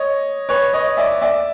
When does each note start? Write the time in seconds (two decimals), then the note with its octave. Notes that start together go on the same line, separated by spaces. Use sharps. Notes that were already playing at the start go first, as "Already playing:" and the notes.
Already playing: C#5 D#5
0.49 B4 C#5
0.73 C#5 D#5
0.97 D5 E5
1.22 D5 E5